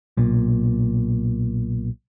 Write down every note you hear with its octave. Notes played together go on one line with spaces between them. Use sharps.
B1 A#2